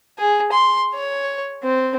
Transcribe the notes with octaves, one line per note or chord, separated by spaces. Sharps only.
G#4
C6
C#5
C4